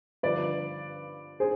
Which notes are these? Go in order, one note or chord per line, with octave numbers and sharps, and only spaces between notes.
G2 D3 F3 B4 D5
G#4 C5